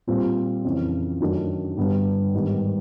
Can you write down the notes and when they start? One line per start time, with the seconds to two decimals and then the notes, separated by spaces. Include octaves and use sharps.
0.07 A#2 G3 C4 F4
0.65 F2 C#3 E3
1.20 F#2 D#3 F#3 A3 D4
1.77 G2 D3 G3 B3
2.33 G#2 D#3 G3 B3